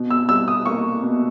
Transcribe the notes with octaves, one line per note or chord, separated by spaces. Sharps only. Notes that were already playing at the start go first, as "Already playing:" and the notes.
Already playing: B2
E6
G3 E6
D#6
A#3 C#6
B2